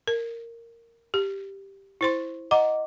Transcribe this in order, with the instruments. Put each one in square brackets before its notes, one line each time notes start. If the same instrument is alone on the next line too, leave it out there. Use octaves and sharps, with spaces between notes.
[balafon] A#4
G4
E4 C5 C6
[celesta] D#5 D6 [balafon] F#5 A#5